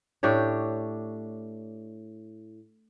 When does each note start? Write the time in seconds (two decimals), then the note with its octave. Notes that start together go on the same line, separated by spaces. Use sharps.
0.23 A2 D4 G4 C#5